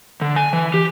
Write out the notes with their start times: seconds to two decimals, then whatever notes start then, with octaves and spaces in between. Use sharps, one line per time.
0.22 D3
0.36 G#5
0.53 E3
0.74 G4